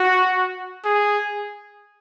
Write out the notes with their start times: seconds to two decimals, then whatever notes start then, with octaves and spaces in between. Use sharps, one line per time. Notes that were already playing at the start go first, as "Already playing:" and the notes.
Already playing: F#4
0.85 G#4